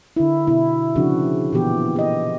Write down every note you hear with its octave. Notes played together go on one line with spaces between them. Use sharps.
D3 E4
B2 E4
C#3 F3 C4 D4 F#4
A#2 E3 B3 G4
G4 D#5